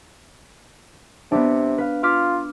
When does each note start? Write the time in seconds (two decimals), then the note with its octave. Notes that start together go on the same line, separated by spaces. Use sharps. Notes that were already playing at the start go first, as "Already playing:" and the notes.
1.32 C3 B3 D4
1.78 B4 F5
2.03 F4 D6 F6 B6